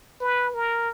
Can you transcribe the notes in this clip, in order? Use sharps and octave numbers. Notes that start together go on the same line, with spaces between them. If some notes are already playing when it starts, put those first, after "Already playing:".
B4
A#4